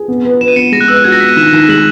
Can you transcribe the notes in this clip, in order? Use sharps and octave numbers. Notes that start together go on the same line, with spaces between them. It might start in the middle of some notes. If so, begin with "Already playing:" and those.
Already playing: G#4
B3
B4
B4 E7
D#7
B3 C#7
G#3 A#6
F#6
B4 E6
F#6
F#4 G#6
A#6
B3 B6
D#7
D#3 E7
D#3 E7
G#3 F#7